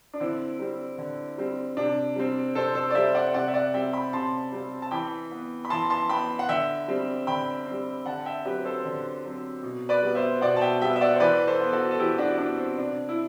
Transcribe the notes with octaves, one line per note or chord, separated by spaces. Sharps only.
D4
D3 C4 E4
G3 C4
D3
G3 C4
C3 D4
G3 C4
C3 A4 C5
A4 C5
D5
G3 C4 C5 E5
D5 F#5
C3 D5 F#5
E5
D5 F#5
G3 C4 E5 G5
G5 B5
C3 A5 C6
G3 C4
A5
E3 G5 B5
B3
B5
E3 A5 C6
A5 C6
B3 G5 B5
F#5
D3 E5 G5
G3 C4
D3 G5 B5
C4
G3
D3 F#5 A5
E5 G5
F#3 C4 G4 B4
A4 C5
D3
F#3 C4
B2
B4 D5
G3 B3
C5 E5
B2 D5 F#5
A5
E5 G5
G3 B3 E5 G5
E5
D5 F#5
C5
E3 B4 D5
A4 C5
B3
F#4 A4
A4
E3 E4 G4
D4 F#4
B3 D4
C4
C3 D4
E4